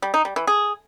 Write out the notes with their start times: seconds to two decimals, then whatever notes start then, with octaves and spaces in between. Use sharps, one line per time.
0.02 G3
0.14 D#4
0.25 G3
0.36 E3
0.47 G#4